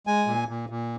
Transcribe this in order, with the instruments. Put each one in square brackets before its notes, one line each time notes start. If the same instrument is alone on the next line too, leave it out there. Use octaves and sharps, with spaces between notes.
[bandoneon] G#3 G#5
A#2
A#2
A#2